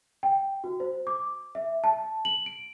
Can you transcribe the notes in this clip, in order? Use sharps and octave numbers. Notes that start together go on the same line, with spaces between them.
G5
F#4
C5
D6
E5
A5
F#7
D7